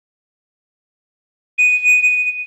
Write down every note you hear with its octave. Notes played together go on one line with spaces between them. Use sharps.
D#7